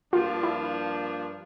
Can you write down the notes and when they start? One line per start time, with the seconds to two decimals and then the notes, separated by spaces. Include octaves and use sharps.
0.13 G2 F3 A#3 D4 F4
0.43 E4